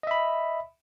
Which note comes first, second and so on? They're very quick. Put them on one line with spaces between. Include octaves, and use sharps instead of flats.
D#5 E5 B5